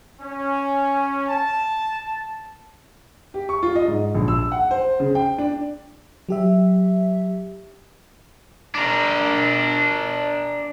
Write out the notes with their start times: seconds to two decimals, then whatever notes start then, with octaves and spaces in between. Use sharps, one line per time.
0.20 C#4
1.29 A5
3.34 G4
3.49 C#6
3.63 F4
3.76 D#5
3.88 G#2
4.14 A#1
4.28 E6
4.52 F#5
4.71 C5
5.00 C#3
5.15 G5
5.38 D4
6.29 F#3 G4 E5
8.75 D4 A#4